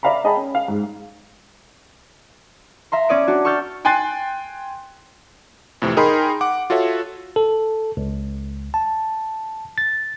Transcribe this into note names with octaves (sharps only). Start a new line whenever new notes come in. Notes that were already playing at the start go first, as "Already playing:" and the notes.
D5 E5 F5 A#5 B5
G#4 D#5 G5 A5 B5
C#4
F5
G#2
E5 A#5 C6
C#4 C#5 D5 D6 D#6 D7
D4 F#4
C#6 E6 F6 G6 A6
G5 G#5 C6 F#6 A6 C7
F2 A2 C3 E3
D#4 G#4 A#4 G5 B5 C6
F#5 D6
F4 F#4 A4 C#5 E5
A4
C#2
A5
A6